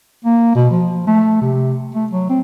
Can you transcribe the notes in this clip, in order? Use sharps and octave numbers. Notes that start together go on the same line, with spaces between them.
A#3
B2
F3
A3
C3
A3
F#3
C4